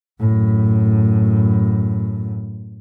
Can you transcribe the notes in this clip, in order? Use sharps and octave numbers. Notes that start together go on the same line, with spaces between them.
F#2 A2